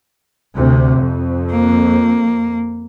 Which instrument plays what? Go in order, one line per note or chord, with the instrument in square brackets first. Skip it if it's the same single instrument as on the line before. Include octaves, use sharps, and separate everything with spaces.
[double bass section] D2 C3
F2
[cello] A#3